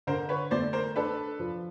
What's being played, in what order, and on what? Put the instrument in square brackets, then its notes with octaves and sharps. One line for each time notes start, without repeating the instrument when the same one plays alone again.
[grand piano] D3 [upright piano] A#4 C5
[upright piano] B4 C#5
[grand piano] A3 [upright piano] C5 D5
[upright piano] A#4 C5
[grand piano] D4 [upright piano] A4 B4
[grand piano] F3